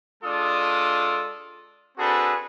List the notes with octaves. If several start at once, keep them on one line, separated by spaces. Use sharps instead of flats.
G#3 D4 F4 A4 D5 D#6
C4 D4 F#4 G#4 A4 B4